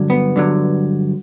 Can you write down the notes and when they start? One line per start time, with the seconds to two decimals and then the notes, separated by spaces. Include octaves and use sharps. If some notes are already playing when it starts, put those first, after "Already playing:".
Already playing: G2 D3 F#3
0.10 B3
0.36 G2 D3 F#3